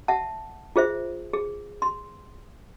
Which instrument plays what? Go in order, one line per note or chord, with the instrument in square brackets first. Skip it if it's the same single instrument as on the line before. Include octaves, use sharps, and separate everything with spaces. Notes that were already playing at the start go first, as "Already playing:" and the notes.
[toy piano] E5 F#5 A5
F4 G#4 C5 E5
G#4
C6